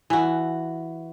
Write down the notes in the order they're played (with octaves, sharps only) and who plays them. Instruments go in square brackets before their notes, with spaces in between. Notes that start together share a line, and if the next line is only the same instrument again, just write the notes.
[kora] E3 F#4